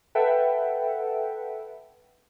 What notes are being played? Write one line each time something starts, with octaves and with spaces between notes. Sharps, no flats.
A4 B4 E5 F#5 G5